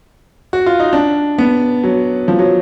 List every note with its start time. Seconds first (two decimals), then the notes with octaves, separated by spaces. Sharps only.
0.53 F#4
0.66 F4
0.80 D#4
0.93 D4
1.38 B3
1.84 F#3
2.28 F3
2.39 F#3